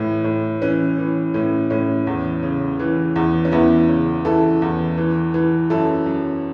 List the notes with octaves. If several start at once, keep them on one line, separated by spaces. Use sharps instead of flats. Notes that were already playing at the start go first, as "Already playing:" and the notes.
Already playing: A2 E3
A2
E3 C#4
E3
A2 C#4
A2 C#4
E2
C#3
E3
E2
C#4
E2 B3 E4
C#3
E3 E4 A4
E2
E3
E3
F#2 E4 A4
F#2